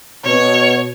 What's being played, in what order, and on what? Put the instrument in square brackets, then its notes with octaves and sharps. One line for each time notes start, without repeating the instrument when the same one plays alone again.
[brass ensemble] B2 [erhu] C#5